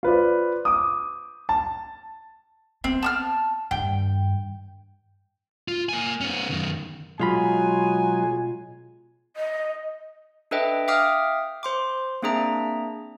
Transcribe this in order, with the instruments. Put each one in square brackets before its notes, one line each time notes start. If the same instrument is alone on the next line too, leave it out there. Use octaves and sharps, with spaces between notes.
[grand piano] F4 B4 C5 D5
D6 D#6
A5
[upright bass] B3 [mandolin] C4
[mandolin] A5 D#6 F6
[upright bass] G2 D#3 [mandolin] G5
[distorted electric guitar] F4
A#3 G#5
B3 C#4
F#2 D#3
[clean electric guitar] B2 F4 B5 [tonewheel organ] F#3 G#3 [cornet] G#5
[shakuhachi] D#5
[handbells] D4 A4 B4 D#5 E5 G5
E5 F5 G5 D6 D#6 F6
C5 C6 D6
A#3 C4 D4 G#4 E5 A#5